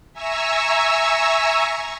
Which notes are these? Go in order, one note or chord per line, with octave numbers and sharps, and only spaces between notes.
E5 G#5 A#5 C#6 E6